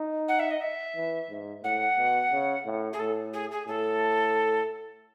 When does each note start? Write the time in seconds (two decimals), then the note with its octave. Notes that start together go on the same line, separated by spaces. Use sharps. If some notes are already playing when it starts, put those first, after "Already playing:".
Already playing: D#4
0.28 F#5
0.39 E5
0.50 D#5
0.60 E5
0.96 E3
1.30 G#2
1.64 A2 F#5
1.97 B2
2.32 C#3
2.66 A2
2.93 G#4
2.99 A2 A4
3.33 G#4
3.51 G#4
3.67 A2 A4